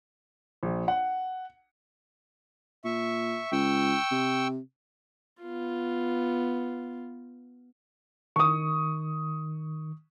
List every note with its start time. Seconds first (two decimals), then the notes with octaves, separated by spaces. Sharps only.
0.63 A#1
0.88 F#5
2.84 A#2 E5 C#6
3.52 C#2 G5 C#6 E6
4.11 C3
5.41 B3 F4
8.36 D#3 C#6 D#6